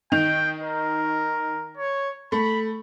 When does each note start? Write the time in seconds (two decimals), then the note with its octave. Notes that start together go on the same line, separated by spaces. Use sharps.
0.12 D#3 D#4 G5 F7
0.63 A#4
1.77 C#5
2.32 A3 B5